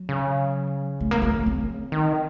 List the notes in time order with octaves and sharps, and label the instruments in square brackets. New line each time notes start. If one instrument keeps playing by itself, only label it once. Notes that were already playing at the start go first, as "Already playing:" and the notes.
Already playing: [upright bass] F#3
[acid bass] C#3
[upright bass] A3
A#3
A3
C4
[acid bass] D#3